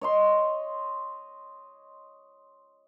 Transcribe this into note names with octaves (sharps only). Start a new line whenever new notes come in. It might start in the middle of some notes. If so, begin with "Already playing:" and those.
C#5 D#5 C6